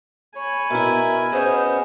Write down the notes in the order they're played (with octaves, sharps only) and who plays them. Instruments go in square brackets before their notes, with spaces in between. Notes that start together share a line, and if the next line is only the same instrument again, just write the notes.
[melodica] C#5 [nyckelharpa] G#5 B5
[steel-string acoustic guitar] B2 E4 [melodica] A#4 E5
[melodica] B3 C#4 G#4 [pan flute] C5 [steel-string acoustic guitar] D#5